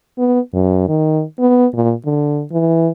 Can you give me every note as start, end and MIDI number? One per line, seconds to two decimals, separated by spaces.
0.18 0.40 59
0.54 0.84 42
0.88 1.23 51
1.39 1.67 59
1.74 1.94 46
2.05 2.43 50
2.52 2.89 52